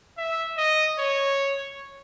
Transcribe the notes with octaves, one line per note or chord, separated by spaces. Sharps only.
E5
D#5
C#5